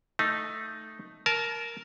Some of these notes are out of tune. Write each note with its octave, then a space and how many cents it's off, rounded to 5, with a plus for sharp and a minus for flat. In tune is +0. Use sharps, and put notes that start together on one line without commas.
A3 +0 D#4 +0
A#4 +0 A5 -30